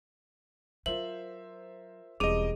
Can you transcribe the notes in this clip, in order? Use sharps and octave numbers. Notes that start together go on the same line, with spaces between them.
F#3 F4 A#4 C5 E5 F#7
E1 E2 G3 C4 G#4 D#5 D6 D#7